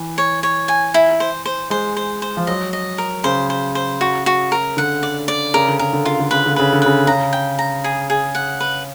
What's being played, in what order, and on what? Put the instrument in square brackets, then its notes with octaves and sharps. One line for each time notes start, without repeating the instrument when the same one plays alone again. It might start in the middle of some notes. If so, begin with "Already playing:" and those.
Already playing: [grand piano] E3
[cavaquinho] C#5
C#5
G#5
E4
C5
C5
[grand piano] G#3 [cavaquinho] C5
[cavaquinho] C5
C5
[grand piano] F3
[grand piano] F#3 [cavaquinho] D#5
[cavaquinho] D#5
A#4
[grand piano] C#3 [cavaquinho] C5
[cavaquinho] C5
C5
F#4
F#4
A#4
[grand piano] D3 [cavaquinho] F#5
[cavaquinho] D5
D5
[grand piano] C#3 [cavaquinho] A#4
[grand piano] D3
[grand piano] C#3 [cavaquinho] A#4
[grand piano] D3
[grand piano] C#3 [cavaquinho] F4
[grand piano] D3
[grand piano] C#3 [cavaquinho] B4
[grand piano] D3
[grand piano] C#3 [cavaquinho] B4
[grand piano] D3
[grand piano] C#3 [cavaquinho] B4
[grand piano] C#3 [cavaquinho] A#5
[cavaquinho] G5
A#5
G#4
G#4
F#5
B4